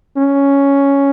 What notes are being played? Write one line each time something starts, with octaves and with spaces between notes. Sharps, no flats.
C#4